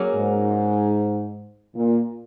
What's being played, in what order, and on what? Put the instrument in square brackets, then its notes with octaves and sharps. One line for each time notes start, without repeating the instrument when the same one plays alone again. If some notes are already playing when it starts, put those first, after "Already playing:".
Already playing: [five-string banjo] F#3 A#3 C#4 G#4
[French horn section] G#2
A#2